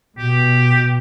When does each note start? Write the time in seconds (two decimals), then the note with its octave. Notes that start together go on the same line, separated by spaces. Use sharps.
0.18 B2 G4